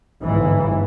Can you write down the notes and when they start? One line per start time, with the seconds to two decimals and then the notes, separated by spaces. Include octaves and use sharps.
0.22 G1 G#2 E3